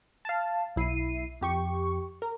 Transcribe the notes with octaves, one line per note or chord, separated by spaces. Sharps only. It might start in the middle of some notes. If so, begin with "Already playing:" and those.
F5 A5
B1 E4 C7 D#7
F2 G4 C#6
A#4